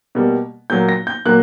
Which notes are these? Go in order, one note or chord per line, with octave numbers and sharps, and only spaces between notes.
B2 G3 A#3
A#2 F#3 A#3 G6
A#6
G6
A#2 F#3 A#3 F#6